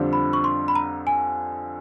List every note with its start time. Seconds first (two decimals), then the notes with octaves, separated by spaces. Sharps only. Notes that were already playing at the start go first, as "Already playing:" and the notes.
Already playing: F2 D3 G3 C4 F4
0.13 B5
0.33 C#6
0.44 C6
0.68 B5
0.75 A#5
1.07 G#5